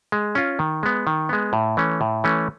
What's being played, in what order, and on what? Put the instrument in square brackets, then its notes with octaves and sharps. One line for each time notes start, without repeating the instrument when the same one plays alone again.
[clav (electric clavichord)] G#3
C#4 F4
D#3
G#3 B3
D#3
G#3 B3
A2
E3 A3 C#4
A2
E3 A3 C#4